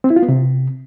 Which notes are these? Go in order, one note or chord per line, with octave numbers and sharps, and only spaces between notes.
C4
E4
F4
B3
C3